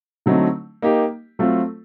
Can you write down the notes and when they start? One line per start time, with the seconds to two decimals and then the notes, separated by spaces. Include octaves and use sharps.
0.26 D3 F#3 A3 C4 D#4
0.82 A#3 D#4 G4
1.39 F#3 A3 C4 F4 A4